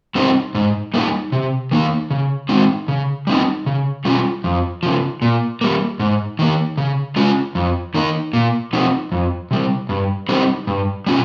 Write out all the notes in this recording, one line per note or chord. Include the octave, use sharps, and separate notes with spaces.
G3 C4 D#4
G#2
G3 A#3 D#4
C3
D#3 A#3 D#4
C#3
G#3 C4 D#4
C#3
G3 C4 D#4
C#3
G3 C#4 F4
F2
C#3 F3
A#2
G3 A#3
G#2
D#3 A#3
C#3
G#3 C#4 F4
F2
D#3 A#3 D#4
A#2
F3 C4 D#4
F2
C3 G3
G2
G3 C4 D#4
G2
G3 C#4 F4